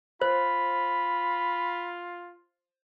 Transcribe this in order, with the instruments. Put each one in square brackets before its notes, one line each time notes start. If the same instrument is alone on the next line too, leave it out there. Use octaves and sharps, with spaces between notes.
[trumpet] F4 [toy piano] C5 [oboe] B5